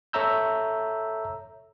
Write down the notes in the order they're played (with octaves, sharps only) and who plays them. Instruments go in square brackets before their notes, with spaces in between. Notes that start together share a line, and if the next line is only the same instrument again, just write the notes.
[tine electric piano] A4 C#5 E5 A#5 E6 G6